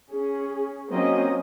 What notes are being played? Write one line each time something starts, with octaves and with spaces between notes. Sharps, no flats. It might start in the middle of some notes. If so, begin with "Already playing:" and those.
C#4 G#4
F#3 A#3 C4 C#4 D#5